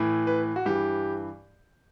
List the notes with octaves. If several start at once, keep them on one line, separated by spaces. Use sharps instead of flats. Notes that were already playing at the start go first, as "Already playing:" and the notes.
Already playing: A2 E3
B4
F#4
G2 E3 G4